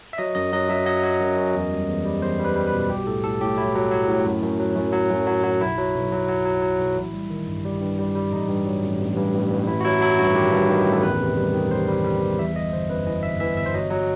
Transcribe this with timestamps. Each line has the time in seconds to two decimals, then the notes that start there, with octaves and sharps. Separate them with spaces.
0.13 E5
0.18 F#3 D#5
0.35 F#2 D#5
0.53 F#3 D#5
0.70 F#3 E5
0.86 F#3 D#5
1.03 F#3
1.21 F#2
1.37 F#2
1.55 E2
1.71 G3
1.88 E2
2.05 G3
2.22 E2 C5
2.39 G3
2.45 B4
2.56 G3
2.67 B4
2.73 B2
2.90 B1 G4
3.06 A2 A4
3.24 A2 A4
3.41 A2 G4
3.57 F#3 E4
3.75 F#3
3.92 F#3
4.08 A2
4.25 F#2
4.43 F#2
4.60 F#3
4.76 F#2
4.93 F#3
5.11 F#2
5.27 F#3
5.44 F#3
5.61 B1 E4
5.78 F#3
5.95 B1
6.12 F#3
6.29 F#3
6.45 F#3
6.62 F#3
6.80 B1
6.96 A1
7.13 G3
7.30 D#3
7.47 G2
7.65 G3
7.81 G2
7.99 G3
8.15 G3
8.31 A1 D#4
8.48 G2
8.65 F#3
8.83 A1
9.00 A1
9.17 G2
9.34 A1
9.50 A1
9.67 A1 E4
9.80 F#4
9.85 F#3 E4
10.01 F#3 E4
10.19 G2 F#4
10.35 D#3 G4
10.52 G2
10.69 D#3
10.86 A1
10.93 A4
11.03 E2 B4
11.20 C3
11.36 G3
11.54 D#3
11.71 G3 C5
11.88 G3
12.05 G3
12.22 E2
12.39 E3 E5
12.55 G1 D#5
12.73 G1 C5
12.89 F#2 B4
13.06 E3 D#5
13.23 G1 E5
13.40 E3 E5
13.57 G1 E5
13.66 C5
13.74 F#3 D#5
13.91 F#3